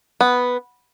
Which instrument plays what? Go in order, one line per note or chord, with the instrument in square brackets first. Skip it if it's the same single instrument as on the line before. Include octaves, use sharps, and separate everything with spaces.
[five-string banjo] B3